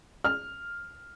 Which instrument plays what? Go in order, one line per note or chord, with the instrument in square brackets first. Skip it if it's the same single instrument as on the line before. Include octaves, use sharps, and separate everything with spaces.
[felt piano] F6